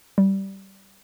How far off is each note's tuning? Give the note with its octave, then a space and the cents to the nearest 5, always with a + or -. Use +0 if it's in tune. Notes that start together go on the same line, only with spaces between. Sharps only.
G3 -15